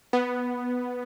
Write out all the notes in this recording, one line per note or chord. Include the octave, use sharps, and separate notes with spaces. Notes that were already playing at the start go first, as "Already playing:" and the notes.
B3